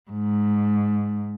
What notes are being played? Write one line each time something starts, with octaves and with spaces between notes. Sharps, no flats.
G#2